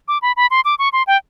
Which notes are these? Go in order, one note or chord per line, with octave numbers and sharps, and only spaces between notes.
D6
B5
B5
C6
D6
C#6
C6
G5